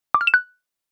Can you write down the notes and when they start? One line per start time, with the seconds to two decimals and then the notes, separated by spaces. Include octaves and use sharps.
0.14 D6
0.21 F6
0.27 E7
0.34 F#6